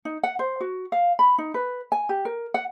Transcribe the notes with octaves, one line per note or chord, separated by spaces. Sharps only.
D#4
F#5
C5
F#4
F5
B5
D#4
B4
G#5
G4
A#4
F#5